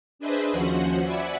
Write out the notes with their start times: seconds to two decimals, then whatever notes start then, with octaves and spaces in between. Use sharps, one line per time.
0.19 D4 G#4 B4 C5 D#5 E5
0.52 D#2 F3 C#4 F#4 C5 F#5
1.01 D5 E5 F#5 G#5 B5